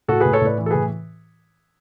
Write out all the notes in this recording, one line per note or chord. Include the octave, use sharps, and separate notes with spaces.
A2 F#4 A4
A2 G#4 B4
A4 C#5
A2 B4 D5
E3
A4
A2 G#4 B4